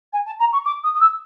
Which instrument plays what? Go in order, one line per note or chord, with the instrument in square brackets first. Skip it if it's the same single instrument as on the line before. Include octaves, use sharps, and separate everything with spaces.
[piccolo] G#5
A5
A#5
C#6
D6
D#6
D#6
E6